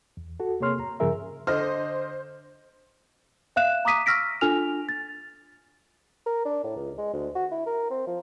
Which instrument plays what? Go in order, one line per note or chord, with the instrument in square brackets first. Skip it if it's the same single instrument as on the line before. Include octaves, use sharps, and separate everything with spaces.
[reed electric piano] E2
F#4 A4
C3 A#3 G#4 C#5 C6 F6
A#5
G2 C#3 F3 G#4 A#4 E5
[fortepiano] D3 D#5 F6 [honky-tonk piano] C5
[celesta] E5 F5 F#6 E7
A#5 D6 D#6 B6 D#7
C#6 E6 F6 A#6 B6 D7
D4 F4 A4 G#5 F6 F7
A6
[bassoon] A#4
D4
A2
C#2
G#3
D2
F#4
E4
A#4
C4
F3